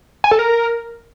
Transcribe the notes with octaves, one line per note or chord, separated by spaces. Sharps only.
G#5
A4
A#4